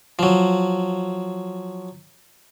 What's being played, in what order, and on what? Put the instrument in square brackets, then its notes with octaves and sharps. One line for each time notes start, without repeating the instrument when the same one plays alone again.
[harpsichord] F3 F#3